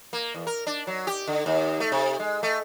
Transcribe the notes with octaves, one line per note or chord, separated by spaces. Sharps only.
A#3
E2
A#4
D4
F#3
G4
D3
D#2
A3
C3
G#3
A3